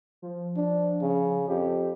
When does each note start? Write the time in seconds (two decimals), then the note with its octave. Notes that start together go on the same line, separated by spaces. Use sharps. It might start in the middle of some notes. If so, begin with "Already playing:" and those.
0.22 F3
0.56 D4
1.02 C#3
1.48 F2 G4